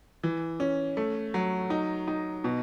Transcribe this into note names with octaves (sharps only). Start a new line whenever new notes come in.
E3
C#4
A3
F#3
D#4
D#4
B2